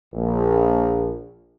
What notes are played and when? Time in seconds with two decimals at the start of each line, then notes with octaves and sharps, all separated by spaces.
0.14 A#1